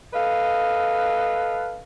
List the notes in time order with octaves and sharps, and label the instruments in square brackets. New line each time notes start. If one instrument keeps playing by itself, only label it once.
[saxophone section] A4 B4 D#5 F5